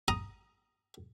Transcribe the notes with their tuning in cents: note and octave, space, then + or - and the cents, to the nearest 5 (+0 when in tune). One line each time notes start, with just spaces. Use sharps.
A#5 +10 D#6 +0